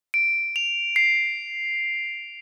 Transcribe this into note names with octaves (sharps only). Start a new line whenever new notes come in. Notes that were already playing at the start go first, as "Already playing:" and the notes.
D7
F7
C7